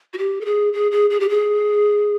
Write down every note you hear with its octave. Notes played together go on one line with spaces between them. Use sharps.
F#4
G4
A4
G#4
G#4
G#4
G#4
G4
G#4